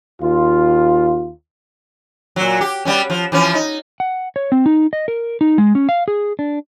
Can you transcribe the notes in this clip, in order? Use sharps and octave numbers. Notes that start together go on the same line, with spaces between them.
D#2 F4
A#2 F#3
G4
G3 B3 C#4
F3
E3 F3 C#4
D#4
F#5
C#5
C4
D#4
D#5
A#4
D#4
G#3
C#4
F5
G#4
D4